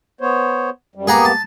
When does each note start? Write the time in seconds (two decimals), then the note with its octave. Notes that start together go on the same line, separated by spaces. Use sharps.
0.21 B3 C5 C#5
0.95 F#2 G3
1.07 A#3 B3 G4 G#4 F#5 A#5
1.25 A5